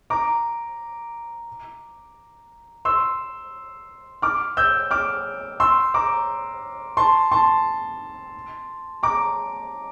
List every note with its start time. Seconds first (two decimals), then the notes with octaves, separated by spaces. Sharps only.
0.10 A#5 D6
2.85 C6 E6
4.22 D6 F6
4.57 E6 G6
4.91 D6 F6
5.60 C6 E6
5.94 A#5 D6
6.97 A5 C6
7.31 A5 C6
9.03 A#5 D6